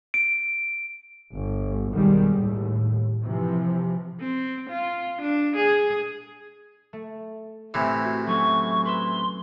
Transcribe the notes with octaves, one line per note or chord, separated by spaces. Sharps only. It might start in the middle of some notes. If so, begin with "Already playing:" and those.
D7
G1
B1 D#3 G3 G#3
D#2 A2
C3 E3 F3
C4
F4
D4
G#4
A3
A2 C3 E3
F#4
F#3 A3 C#4 C#6
B4 C6 E6